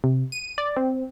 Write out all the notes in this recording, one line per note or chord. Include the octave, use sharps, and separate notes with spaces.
C3
D#7
D5
C4